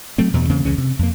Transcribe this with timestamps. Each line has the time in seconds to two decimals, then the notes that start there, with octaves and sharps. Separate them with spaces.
0.18 F#3 A3 C4
0.34 E2 G2 B2
0.49 E2 C#3 A#3 C4
0.65 C#2 C#3 E3 C#4
0.78 C3
0.99 F2 A#3